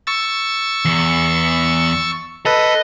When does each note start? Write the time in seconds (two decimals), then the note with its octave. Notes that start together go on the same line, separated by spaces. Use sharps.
0.07 C#6 E6 A6
0.85 E2
2.46 A4 B4 D#5